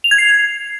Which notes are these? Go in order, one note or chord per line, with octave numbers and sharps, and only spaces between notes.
F7
G#6
C7